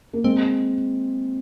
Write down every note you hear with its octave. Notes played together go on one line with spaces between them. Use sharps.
A#3
G#3 C4